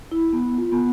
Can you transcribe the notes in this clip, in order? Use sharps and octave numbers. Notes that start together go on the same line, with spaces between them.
E4
B3
F4
B3